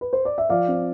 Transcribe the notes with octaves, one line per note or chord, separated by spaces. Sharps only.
B4
C5
D5
E5
F3 D5 F5
C4